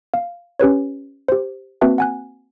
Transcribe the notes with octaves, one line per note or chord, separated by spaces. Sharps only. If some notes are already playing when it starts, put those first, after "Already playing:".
F5
C#4 G4 B4 C#5
G4 C5
A#3 C4 F#4 B4 E5 A5
F#5 G#5 F#6